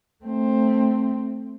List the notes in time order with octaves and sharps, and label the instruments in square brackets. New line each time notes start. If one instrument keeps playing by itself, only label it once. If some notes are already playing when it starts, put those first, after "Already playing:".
[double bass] A3 C4